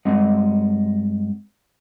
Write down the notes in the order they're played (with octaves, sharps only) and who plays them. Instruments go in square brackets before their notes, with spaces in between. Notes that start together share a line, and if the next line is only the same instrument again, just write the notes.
[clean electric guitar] G2 G#3 C4 D#5 F#5